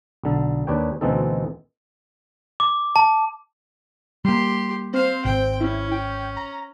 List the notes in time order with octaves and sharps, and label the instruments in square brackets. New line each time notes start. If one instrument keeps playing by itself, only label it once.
[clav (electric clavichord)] B1 D3 A4
D#2 D4 B4 C#5 G5
D2 B2 E3 C4 D#4 A4
[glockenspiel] D6
A5
[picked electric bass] G3 A#3 [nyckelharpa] G4 C6
[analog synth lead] C4 [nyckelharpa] C5 F5
[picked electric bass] G#1 [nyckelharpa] G5
[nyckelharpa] C#4 [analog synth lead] E4
[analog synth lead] G5
A#5